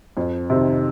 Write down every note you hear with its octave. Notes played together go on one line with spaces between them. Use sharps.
F2
C3 D#3